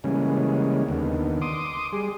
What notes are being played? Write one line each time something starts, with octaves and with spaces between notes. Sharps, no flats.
C#3 E3 G3 G#3 A#3 C#4
D#2 D3 D#3 B3
C6 D6 D#6
G3 G#4